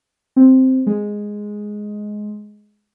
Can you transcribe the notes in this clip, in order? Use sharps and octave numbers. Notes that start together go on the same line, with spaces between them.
C4
G#3